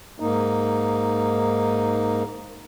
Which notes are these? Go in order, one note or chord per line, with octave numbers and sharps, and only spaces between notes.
G#2 A#3 D#4